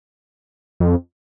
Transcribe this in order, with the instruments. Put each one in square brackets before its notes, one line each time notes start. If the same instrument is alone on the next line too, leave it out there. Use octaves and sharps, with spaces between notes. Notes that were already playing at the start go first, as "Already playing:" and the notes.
[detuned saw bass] F2